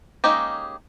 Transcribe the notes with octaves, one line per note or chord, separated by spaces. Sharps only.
G#3 A#3 C#4 D#4 G4